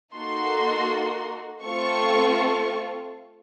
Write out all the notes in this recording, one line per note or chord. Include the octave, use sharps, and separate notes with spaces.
A#3 D#4 F#4 A4 C6
A3 C4 F4 A4 C#6